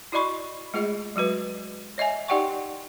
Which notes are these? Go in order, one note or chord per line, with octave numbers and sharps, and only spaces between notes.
E4 F#4 D5 D#5 B5 C#6
G#3 A3 F4 G#4 D#5
F#3 G#3 F#4 B4
C#5 D#5 E5 G#5
D#4 G4 D5 F#5 G5 C#6